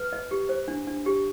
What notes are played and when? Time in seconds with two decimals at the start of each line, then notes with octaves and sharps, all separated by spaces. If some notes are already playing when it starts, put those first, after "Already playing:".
Already playing: B4
0.13 D#5
0.31 G4
0.49 C5
0.68 D4
0.87 D4
1.06 G4